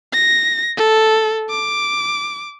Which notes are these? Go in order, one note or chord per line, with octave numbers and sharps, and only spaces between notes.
A#6
A4
D6